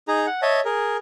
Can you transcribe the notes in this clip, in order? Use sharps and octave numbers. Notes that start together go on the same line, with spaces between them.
D#4 G#4 A#5
F#5
C#5 D#5 E5 A5
G#4 A#4